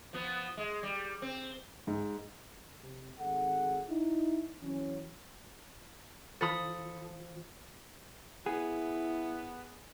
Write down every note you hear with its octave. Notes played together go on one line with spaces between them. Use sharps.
F3 B3
G#3
G3
C4
G#2
C3
G#1 G#4 A4 F#5
D#4 E4
E3 F#3 C#4
E3 F4 A4 C5 B5 D#6
B3 E4 G#4